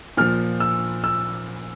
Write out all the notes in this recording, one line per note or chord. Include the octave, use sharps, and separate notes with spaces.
A#2 F3 F6
E6
E6